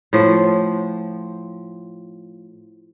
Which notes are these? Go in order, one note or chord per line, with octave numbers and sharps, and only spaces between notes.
A2 F3